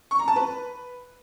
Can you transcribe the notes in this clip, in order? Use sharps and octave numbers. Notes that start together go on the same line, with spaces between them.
C#6
A#5
A5
B4